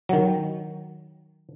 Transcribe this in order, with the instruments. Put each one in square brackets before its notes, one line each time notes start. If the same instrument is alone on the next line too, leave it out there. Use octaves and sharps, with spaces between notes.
[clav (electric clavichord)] D#3 F#3